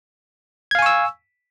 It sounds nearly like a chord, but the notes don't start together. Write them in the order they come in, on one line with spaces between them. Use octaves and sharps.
G#6 F5 G#5 C#6 E6